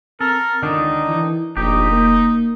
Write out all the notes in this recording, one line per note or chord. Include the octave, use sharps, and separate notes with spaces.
C4 A4 A#4
C#2 D3 D#3 D4 D#4
E3
F1 A#1 D#4 G4
A#3